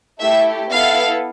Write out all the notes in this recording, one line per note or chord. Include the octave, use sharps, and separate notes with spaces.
A3 E4 G4 E5
B3 E4 A4 F5